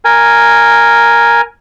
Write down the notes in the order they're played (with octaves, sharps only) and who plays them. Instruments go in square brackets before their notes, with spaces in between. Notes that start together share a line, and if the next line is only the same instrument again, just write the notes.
[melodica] A#4 G#5